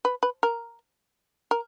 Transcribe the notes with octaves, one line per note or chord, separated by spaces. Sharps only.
B4
B4
A#4
A#4